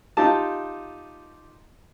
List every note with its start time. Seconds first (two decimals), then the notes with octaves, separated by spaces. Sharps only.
0.17 D#4 F4 G4 A5